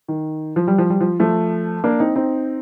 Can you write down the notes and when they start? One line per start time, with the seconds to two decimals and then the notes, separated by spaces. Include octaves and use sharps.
0.08 D#3
0.56 F3
0.67 G3
0.78 F3
0.90 G3
1.00 F3
1.20 F3 A3
1.84 A#3 D4
2.00 C4 D#4
2.16 C4 D#4